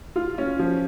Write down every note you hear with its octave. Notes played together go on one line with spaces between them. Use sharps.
F4
C#4
F3